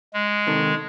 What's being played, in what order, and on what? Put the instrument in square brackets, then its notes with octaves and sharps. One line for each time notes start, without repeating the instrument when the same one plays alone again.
[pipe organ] G#3
[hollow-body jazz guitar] C3 D#3 A4